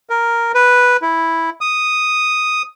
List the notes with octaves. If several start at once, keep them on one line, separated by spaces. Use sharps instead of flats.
A#4
B4
E4
D#6